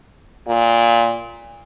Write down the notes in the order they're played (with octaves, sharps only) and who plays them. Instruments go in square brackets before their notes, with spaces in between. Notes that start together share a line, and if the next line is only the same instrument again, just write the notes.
[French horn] A#2